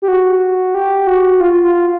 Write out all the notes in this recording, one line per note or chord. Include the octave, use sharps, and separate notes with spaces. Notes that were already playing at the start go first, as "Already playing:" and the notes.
G4
F#4
G4
F#4
F4
F4